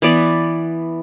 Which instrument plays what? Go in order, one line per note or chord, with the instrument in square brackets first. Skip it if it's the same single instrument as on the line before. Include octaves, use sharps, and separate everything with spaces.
[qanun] E3 B3 D5